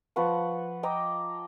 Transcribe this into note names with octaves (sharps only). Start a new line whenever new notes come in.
F3 B4 F#5 C#6
D#5 G5 A#5 D6